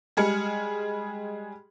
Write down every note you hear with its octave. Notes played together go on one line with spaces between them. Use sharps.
G3 G#3 G#4 F6 C#7